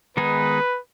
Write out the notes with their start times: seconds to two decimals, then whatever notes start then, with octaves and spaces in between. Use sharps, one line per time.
0.17 D#3 G#3 B3 D#4 G#4 B4